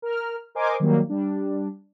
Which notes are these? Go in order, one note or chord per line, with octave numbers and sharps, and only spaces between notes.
A#4 F6
A#4 C5 D#5 G#5 C6 D6
D#3 F#3 G3 A#3
G3 D4